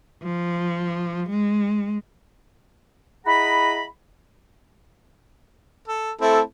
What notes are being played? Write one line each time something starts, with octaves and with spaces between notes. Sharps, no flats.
F3
G#3
E4 G#4 D#5 F#5 A#5 B5
A4
A3 C4 E4 A4